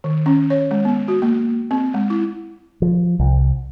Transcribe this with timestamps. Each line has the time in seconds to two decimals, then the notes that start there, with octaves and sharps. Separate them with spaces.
0.04 D#3
0.26 C#4
0.50 C#5
0.71 G#3
0.85 B3
1.08 F#4
1.22 A#3
1.71 C4
1.94 G#3
2.10 E4
2.82 F3
3.19 C2